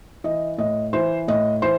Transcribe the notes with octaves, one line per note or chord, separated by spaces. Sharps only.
E3 D#5
A2 D#5
E3 C5
A2 D#5
E3 C5